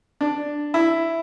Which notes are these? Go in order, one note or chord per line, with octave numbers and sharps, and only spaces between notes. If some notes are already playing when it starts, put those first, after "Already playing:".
D4
E4